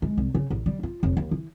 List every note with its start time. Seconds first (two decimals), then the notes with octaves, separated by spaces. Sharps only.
0.02 G#3
0.17 C2
0.35 C#3
0.50 A1
0.66 G3
0.83 F4
1.03 F1
1.17 D#2
1.31 E3